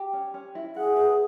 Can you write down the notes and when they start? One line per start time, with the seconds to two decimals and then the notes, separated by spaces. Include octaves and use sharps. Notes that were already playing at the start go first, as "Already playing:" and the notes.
Already playing: G4
0.13 C#4
0.34 C#4
0.55 E4
0.76 G#4 F#5
0.96 B4